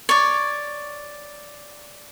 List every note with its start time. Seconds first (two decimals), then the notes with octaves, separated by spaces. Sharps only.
0.09 C#5 D5